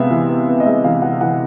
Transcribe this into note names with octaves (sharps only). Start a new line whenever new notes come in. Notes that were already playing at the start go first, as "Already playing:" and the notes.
Already playing: C3 G#3 B3 E5 F5
E3
B3
B3
D#5
G#3 E5
E3 F5
E3 F#5
E3 F#5